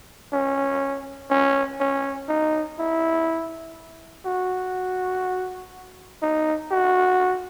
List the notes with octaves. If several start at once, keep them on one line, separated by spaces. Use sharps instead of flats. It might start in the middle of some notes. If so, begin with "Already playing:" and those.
C#4
C#4
C#4
D#4
E4
F#4
D#4
F#4